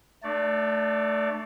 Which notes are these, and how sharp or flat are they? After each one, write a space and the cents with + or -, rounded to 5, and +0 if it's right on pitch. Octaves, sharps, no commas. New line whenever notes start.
A3 +0 D4 +40 D5 -20